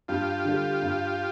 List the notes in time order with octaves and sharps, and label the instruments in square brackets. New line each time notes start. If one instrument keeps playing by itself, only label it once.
[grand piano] G2 [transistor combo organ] F4 G4
[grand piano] D3 G3
G2